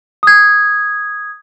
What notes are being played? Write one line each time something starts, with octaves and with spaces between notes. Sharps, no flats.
D#6 G#6